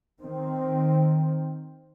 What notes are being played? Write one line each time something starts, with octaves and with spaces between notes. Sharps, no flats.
D#3 C4